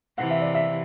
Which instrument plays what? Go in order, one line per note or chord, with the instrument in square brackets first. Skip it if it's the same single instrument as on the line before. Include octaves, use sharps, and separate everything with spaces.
[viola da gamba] C3 E3 [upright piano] F#5
[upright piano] E5
D5
E5